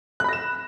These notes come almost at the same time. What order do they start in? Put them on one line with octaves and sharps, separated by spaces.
F#6 B5 A#6 E7